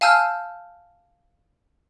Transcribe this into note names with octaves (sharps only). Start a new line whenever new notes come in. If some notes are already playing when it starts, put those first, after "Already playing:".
F5 G#5 A5 E6 F6 G6